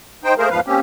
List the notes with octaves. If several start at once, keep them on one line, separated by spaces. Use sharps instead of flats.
D#4 C5 G5
A3 A#3 G#4 A#4 C5
E2 G#2 F3 B4 F5
A#3 C4 C#4 G4